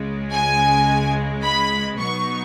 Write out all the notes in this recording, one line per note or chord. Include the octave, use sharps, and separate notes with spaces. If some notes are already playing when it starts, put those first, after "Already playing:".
Already playing: C#2 C#3 G#3
G#5
B5
B2 F#3 B3 D#4 C#6